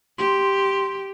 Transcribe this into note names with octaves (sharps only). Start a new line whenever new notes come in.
G4 C6